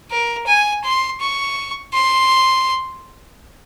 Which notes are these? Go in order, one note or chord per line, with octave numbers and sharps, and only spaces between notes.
A#4
G#5
C6
C#6
C6